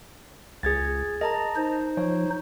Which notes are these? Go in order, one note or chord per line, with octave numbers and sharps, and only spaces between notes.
C#2 G#4 G#6 A6
A#4 D#5 A5 A#5
D#4 C5
F3 C#5